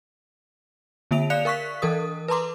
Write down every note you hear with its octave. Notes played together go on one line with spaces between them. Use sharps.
D3 A#3 F4 E5 D7 F7
D5 F5 F#6 C#7 F7
A#4 F5 C#6 F#6 B6
E3 A4 A#4 D#6
B4 A5 A#5 C6 D6